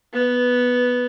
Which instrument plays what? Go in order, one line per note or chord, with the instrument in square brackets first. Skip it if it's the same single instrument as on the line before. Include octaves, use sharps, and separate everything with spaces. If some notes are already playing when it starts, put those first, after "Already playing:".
[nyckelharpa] B3